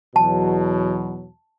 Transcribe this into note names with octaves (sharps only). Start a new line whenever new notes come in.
E2 B2 F#3 A5